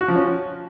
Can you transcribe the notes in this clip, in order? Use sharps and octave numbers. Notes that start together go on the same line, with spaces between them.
F#4
F3
C#4